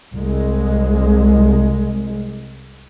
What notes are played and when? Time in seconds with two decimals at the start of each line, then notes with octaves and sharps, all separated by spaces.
0.14 C2 G#3